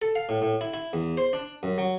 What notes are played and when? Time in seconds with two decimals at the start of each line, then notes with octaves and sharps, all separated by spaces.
0.02 A4
0.16 F5
0.29 A2
0.42 A2
0.61 E4
0.74 E4
0.93 E2
1.17 C5
1.33 D4
1.63 F#2
1.78 F#3